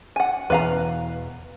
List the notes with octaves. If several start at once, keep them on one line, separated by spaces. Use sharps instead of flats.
F#5 G#5
E2 B2 E3 B4 F5 A#5